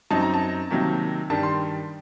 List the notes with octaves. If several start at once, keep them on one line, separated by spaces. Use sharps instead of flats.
F#2 F#3 C4 D#4 A5
A#5
A5
C3 D#3 F#3 A#3 D#4
G2 D#3 G3 D4 A5
C6